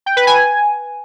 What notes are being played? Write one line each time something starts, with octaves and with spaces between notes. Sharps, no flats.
G5
B4
G#5